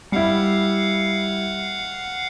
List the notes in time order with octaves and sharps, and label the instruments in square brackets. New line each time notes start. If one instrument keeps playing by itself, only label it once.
[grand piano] G3 E4 [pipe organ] F5 F#5